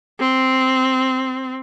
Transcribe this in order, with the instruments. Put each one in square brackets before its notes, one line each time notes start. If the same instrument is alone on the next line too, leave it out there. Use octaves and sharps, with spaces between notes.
[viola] C4